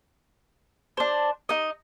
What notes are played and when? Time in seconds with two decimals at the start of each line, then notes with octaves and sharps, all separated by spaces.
0.97 D4 C5
1.49 D#4 D#5